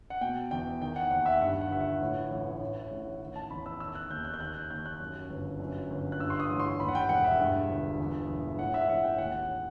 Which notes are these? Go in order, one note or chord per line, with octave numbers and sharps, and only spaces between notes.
F#5
B2 G5
E2 G5
D#3 G5
F#5
D#2 F#5
E5
G2 F#5
F#5
G1 E5
F#5
A2
A1
A2
A1
D#3
A5
E2 B5
E6
D#3 E6
F#6
D#2 G6
F#6
G6
D#3 F#6
G6
D#2 G6
F#6
F#2
G1
F#2
G1
F#6
G2 E6
C6
D#6
A1
C6
D#2 B5
F#5
G5
E1 F#5
E5
G2
G1
E2
E1
A2 F#5
E5
A1 F#5
G5
D#2 F#5